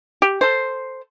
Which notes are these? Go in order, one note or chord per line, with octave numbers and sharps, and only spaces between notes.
G4
A4 C5